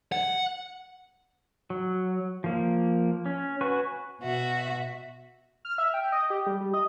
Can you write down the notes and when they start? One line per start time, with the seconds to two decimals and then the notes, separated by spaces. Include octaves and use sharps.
0.12 F#5
1.70 F#3
2.44 F3 A#3
3.26 C#4
3.61 F#4 B4 G#5 C#6
4.21 B2 F#4 E5
5.65 F6
5.78 E5
5.94 G5
6.12 D#5
6.30 G4
6.46 G3
6.61 G3
6.74 D#5